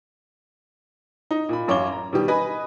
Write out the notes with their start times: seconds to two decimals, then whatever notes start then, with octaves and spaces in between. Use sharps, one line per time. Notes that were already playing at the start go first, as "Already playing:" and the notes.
1.31 D#4
1.49 A#2 B5
1.68 A1 F#2 C#5 F5 D6 G7
1.92 A#5
2.13 B2 D#3 G3 G4
2.28 B4 D#5 G#5 B5